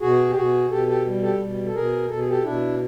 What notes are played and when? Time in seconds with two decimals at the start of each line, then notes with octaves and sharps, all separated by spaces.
0.01 B2 F#4 G#4
0.30 G4
0.35 B2 F#4 G#4
0.70 B2 G4 A4
0.87 G4 A4
1.06 G3
1.22 G4 A4
1.40 B2
1.66 A4
1.74 B2 G#4 A#4
2.10 B2 A4
2.19 G#4
2.28 G4 A4
2.44 B2 D4 E4